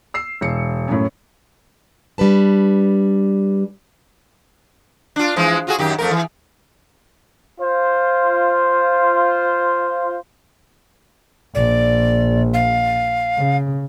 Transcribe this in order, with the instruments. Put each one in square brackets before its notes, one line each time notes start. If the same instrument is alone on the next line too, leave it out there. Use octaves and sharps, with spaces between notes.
[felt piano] E6 C7
E1 C#7
F#2 A2
[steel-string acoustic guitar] G3 D4 B4 A5
[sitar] D4 F4
E3 F3 G#3
F4 F#4 G#4
F#2 D#3 G4
F2 A3 A#4
E3
[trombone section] F4 C5
[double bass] A#1 [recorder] D5
[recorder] F5
[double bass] C#3